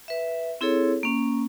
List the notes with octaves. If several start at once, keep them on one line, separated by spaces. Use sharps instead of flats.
B4 E5
C4 E4 G#4 A4 C#5
A#3 C#4